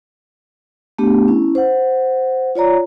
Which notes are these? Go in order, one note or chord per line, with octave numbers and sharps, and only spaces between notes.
A3 B3 D4 G4
C#4 E4
C5 F#5
F4 C#5 D5 A#5